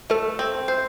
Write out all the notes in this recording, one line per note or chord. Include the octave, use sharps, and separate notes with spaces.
A3 A4
C4
C5